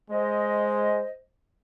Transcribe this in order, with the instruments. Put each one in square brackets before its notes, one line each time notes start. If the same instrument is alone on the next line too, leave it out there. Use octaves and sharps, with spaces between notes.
[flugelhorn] G#3 [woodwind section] C5 D#5